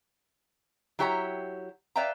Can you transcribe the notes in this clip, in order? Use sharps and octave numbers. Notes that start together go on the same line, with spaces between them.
F#3 E4 G4 C#5 D5 A#5
B4 D5 E5 F5 G5 A#5